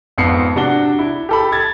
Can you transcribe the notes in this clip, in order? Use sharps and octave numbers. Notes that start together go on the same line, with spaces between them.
G#1 F2 B3 C7 C#7
C3 D4 F#4 G7
E4
G4 A4 B5
G#6 A6